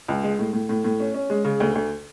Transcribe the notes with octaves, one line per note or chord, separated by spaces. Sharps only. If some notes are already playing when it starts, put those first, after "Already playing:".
C#2
G#3
A2
A2
A2
A2
C#4
C#4
G#3
C#3
D2
D2